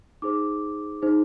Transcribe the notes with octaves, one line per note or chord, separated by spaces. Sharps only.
D#4 G#4 C5 D6
D#4 G#4 C5